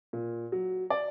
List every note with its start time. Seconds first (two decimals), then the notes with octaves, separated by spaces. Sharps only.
0.13 A#2
0.52 F#3
0.90 D5